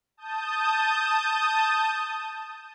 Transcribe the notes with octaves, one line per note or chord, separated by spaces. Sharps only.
A5 D#6 G6